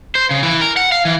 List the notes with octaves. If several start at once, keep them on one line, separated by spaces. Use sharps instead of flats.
C5
C#3
E3
A#4
F#5
F5
E3